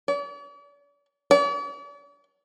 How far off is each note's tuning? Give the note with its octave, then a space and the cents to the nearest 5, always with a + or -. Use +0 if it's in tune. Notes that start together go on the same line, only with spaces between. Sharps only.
D5 -45
D5 -45